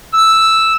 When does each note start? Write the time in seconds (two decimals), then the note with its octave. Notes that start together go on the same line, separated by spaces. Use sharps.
0.13 E6